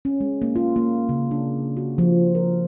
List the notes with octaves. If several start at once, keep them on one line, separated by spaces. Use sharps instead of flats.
C#4
G#3
A#3
F4
A#3
C#3
D4
F#4
F3
A#4